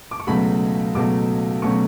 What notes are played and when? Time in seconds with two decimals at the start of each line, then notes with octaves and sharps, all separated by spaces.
0.11 D6
0.20 C#6
0.27 C#2 B2 F#3 A3 C#4 B5
0.95 C#2 B2 F#3 A3 C#4 D6
1.62 B2 F#3 A3 C#4 C#6